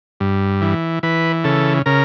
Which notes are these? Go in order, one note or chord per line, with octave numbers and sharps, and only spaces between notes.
G2
E3
E3 B4
C#3 A4
C#3 A#4